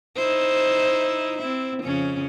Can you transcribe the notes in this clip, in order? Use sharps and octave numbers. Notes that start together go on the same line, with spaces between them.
D#4 E4 C5
C4 E4
F2 C#3 C#4